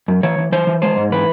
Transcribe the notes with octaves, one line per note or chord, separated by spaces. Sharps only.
F#2
E3 C#5
E3
E3 C5
E3
G#3 C5
G#2
E3 B4